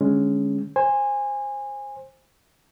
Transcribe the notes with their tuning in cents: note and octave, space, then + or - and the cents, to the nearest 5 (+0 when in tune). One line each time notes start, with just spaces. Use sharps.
D3 +25 G#3 +0 C#4 +0
C5 +15 G#5 -20